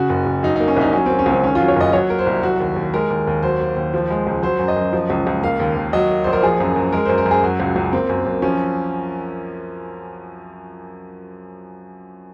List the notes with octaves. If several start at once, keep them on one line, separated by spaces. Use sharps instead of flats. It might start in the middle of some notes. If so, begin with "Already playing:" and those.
Already playing: C#3 F#4
F#1
F#1
F#3 D#4
A#3 D#4
C#4
C2 D#4
F#3 C#4
A#3 C4
C#4
C#2 C4
D#3 C#4
F4
F#3
C#5
F#1 D#5
F#3 C#5
A#3 A#4
C5
C2
F#3 F#4
D#2
D#2
G#3 A#4
D#2
D#2
F#3 C5
A#3
D#2
F3
G#3
C#2
F#3 C5
F#2
D#5
F#2
F3
C#2
C#2
A#3 F5
D#2
D#2
F#3 D#5
A#3
A#1 C5
A#4
F3 G#4
F#2
F#2
G#3 A#4
F#2 C5
A#4
F#2
G#4
F#3 F#4
C#2
C#2
A#3 C4
F#2
F#2
F3 C#4